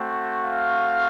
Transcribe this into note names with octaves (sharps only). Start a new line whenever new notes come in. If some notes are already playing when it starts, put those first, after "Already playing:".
Already playing: A3 C4 F#4
F5